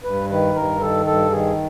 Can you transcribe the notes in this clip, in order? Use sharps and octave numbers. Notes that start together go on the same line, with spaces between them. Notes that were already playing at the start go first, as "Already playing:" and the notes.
G2 B4
D#3 B4
G2 A#4
D#3 A4
G2 A4
D#3 G#4